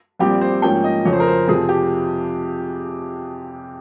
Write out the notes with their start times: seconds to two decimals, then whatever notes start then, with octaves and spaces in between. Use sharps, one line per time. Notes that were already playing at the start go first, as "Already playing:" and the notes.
0.19 A#1 A#2 G3 C4 G4
0.41 C5
0.62 G#2 F3 A#3 C#4 G5
0.84 D#5
1.05 F2 C#3 F3 C#5
1.13 C5
1.20 A#4
1.28 C5
1.47 F2 C3 F3 C4 G#4
1.69 G4